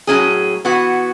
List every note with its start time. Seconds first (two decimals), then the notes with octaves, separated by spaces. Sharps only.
0.07 A2 F#3 C#4 G#4
0.65 E3 B3 F#4